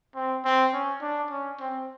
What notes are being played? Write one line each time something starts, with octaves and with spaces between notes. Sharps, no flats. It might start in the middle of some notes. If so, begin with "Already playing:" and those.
C4
C4
C#4
D4
C#4
C4